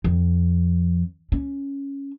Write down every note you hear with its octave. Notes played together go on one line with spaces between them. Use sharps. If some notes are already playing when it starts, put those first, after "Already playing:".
F2
C#4